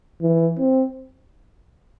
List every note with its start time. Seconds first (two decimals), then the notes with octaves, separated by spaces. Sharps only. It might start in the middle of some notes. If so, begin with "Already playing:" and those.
0.22 E3
0.59 C4